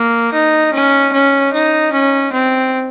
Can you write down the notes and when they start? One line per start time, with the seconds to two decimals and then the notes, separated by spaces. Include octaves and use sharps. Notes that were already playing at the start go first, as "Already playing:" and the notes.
Already playing: A#3
0.33 D#4
0.74 C#4
1.13 C#4
1.53 D#4
1.93 C#4
2.33 C4